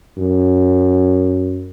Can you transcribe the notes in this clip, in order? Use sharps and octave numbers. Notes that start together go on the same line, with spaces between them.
F#2